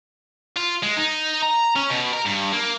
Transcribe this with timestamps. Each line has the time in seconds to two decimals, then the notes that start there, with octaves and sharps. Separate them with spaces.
0.56 F4
0.83 G#3
0.97 D#4
1.42 A#5
1.76 C#4
1.90 B2
2.13 A#4
2.26 G2
2.54 A#3